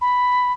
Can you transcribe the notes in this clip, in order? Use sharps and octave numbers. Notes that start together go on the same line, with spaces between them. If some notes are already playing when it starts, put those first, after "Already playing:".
B5